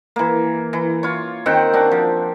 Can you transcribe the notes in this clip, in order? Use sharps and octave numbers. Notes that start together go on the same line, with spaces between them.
E3 A#3
E3
F4 C#5
D#3 C4 F#5 G5
D4 F#4
F3